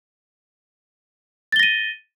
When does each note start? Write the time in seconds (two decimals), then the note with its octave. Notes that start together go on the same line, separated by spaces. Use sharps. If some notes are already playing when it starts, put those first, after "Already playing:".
1.52 A6
1.56 G7
1.59 A#6
1.63 D#7